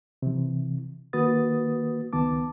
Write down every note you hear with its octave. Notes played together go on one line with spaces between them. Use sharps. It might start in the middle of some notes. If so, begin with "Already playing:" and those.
C3 E3
D#3 A#3 F#4 B4 D#6 A6
C#2 D#3 B3 A5 D6